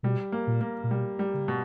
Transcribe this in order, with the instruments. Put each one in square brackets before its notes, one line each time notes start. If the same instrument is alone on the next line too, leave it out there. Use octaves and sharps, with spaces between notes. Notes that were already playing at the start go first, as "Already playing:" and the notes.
[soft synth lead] B2 [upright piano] G3
[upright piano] A#3
[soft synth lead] A#2
[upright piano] A#3
[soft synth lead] A#2
[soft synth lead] B2 [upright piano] G3
[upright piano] G3
[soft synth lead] C#3
[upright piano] B2